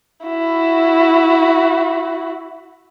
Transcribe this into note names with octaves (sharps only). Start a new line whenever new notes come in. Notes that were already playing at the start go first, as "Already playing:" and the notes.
E4 F#4